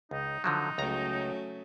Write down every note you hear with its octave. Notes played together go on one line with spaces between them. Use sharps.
C#2 D#4
D3 F3 F#3 D#4
C#2 F#3 A3 C#4 A#5